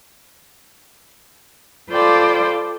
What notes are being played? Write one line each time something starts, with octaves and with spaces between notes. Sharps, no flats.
F4 A4 C5 D5 G5 B5